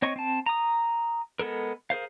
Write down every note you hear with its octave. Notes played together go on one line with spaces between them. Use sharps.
C4 C#5 D#5 C#6
C4 A5
A#5 D#6
G#3 B3 A4 A#4
G#4 A#4 C5 F5